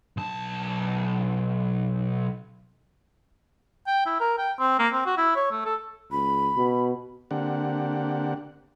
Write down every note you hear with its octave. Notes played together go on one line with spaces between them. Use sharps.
B1 A5
G5
E4
A#4
G5
C4
A#3
C4
F#4
E4
C#5
A3
A4
C#2 B5
B2
D3 A#3 C4 D4 G4 F#5